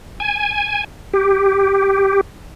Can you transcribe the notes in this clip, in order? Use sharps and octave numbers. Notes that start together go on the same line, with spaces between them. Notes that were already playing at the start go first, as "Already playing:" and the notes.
G#5
G4